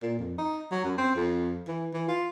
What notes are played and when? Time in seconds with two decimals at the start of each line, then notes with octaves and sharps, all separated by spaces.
0.03 A#2
0.19 F2
0.38 D#4
0.71 F#3
0.84 F#2
0.98 C4
1.16 F2
1.68 E3
1.94 E3
2.09 F4